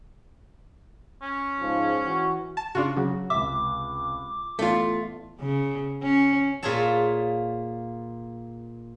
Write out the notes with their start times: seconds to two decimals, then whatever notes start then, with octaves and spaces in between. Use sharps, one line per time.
1.22 C#4
1.60 G#2 F3
2.05 E3 F#4
2.57 A5
2.75 C#3 D4 F4 F#4
2.97 C#3 F#3 F#4
3.30 C#2 C3 E5 D6
4.59 A1 A3 B3 F4 D5
5.40 C#3
6.03 C#4
6.63 A#2 F4 G#4 C#5 E5 A5